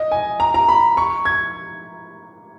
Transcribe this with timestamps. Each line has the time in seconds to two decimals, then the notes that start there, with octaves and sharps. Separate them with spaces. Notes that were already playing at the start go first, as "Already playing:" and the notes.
Already playing: D#5
0.11 G#5
0.40 A#5
0.54 A#5
0.69 B5
0.97 C#6
1.25 G#6